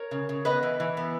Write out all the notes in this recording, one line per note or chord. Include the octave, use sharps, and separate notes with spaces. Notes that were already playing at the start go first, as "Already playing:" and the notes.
Already playing: A#4 C#5
C#3
C#3
B3 B4 D#5
E3
E3
B3